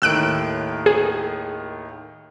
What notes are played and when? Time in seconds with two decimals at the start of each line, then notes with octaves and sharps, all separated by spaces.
0.02 D#2 A2 D#3 E6 F#6 D7
0.86 G#4